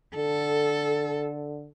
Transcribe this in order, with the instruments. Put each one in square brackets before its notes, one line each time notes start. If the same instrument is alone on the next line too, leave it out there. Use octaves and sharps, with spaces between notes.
[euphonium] D3 [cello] A4